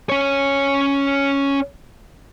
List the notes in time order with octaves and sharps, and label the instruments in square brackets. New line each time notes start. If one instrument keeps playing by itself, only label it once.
[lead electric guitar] C#4 C#5